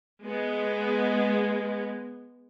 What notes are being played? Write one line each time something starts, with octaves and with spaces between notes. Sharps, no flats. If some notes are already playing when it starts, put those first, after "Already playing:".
G#3 B3